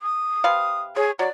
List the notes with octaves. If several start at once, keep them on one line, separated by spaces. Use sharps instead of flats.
D#6
C3 B4 F5
G#4 C#5
F#3 D5